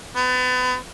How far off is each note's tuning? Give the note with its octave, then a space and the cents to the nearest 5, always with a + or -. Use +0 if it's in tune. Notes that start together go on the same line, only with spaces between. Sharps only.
B3 +35